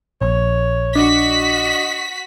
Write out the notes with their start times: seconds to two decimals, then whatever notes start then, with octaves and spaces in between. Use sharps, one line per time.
0.22 A#1 C#5
0.95 D4 F#4 D#5 B6